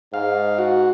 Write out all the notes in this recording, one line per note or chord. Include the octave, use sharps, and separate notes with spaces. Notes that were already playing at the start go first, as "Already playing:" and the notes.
G#2 F5
F#4